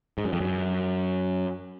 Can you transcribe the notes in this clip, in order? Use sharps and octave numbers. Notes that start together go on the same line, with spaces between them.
G#2
F#2
F2
F#2